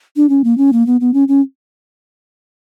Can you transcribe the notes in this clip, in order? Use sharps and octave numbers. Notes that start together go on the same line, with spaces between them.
D4
C#4
A#3
C#4
A#3
B3
B3
C#4
C#4